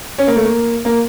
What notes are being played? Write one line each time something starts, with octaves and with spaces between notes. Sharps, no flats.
C#4
A#3
A3
A#3
A#3